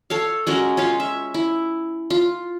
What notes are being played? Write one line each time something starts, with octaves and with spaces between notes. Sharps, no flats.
A4 C#5 F5
G#3 C#4 F#4 A#4
C#4 F4 C#5 F5
E5
E4
F4